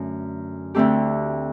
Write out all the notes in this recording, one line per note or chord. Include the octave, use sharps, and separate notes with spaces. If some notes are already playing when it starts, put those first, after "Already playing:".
Already playing: F#2 D3 A3
D2 D3 A3 C4 G4